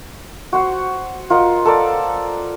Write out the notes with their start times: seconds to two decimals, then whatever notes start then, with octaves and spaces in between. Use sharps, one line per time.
0.53 F#4 C5 F#5
1.30 F4 A#4 D#5 F#5
1.65 A4 A#4 D5